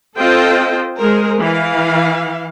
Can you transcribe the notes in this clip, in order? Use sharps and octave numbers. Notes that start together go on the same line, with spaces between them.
C4 F4 A4 C5 D#5 G5
G#3 G#4 A#4 C5
E3 F5